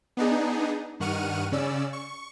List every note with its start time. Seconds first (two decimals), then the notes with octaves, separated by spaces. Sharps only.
0.17 B3 D4 D#4 G#4
1.00 G2 D#3 F#5 C#6 F6 D#7
1.52 C#3 C#4 D5 E6
1.93 C#6